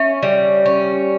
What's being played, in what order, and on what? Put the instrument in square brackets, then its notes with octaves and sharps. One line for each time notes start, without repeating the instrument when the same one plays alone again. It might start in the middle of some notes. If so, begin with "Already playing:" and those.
Already playing: [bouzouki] C#4 [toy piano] E5
[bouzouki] G3
C#4